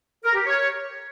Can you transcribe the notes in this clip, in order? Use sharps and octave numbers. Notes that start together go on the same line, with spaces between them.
A#4
G4
C#5